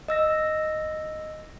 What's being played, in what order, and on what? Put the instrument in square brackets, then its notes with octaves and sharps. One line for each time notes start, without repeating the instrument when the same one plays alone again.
[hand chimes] D#5 E6 A#6